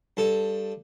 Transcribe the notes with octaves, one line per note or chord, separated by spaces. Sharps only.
G2 A4